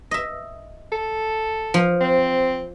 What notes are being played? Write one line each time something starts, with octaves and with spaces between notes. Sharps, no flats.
D#5 E5
A4
F3
C4